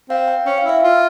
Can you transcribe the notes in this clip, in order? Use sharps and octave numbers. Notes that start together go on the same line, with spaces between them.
C4 F5
G5
C#4 G5
F5
E4 E5
F4 F5